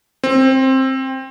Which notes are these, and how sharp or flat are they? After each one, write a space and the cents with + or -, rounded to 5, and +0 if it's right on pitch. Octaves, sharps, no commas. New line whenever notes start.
C4 +15